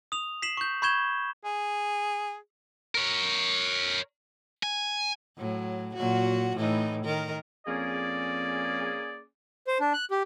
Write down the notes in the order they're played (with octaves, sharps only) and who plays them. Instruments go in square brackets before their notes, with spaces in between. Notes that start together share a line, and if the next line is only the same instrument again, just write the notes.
[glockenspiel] D#6 F7
B6 C7 E7 F#7
C#6 G6
B5 C#6 G6 G#6 E7 G7
[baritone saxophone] G#4
[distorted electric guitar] A#4 C#5
G#5
[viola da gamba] A2 F#3
A#2 F#3 F#4
A2 E3 D#4
D#3 A#4
[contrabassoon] F2 [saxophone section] A#3 C#4 G#4 [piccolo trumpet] D5
[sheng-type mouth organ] C5
D4
F#6
G4